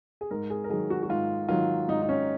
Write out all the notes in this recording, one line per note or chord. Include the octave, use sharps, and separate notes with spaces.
G#4
G#2 A#4
G#4
A#4
D#3 F#3 G#4
F#4
F#4
G#2 F4
D#3 F#3 F4
G#2 D#4
D#4
C#4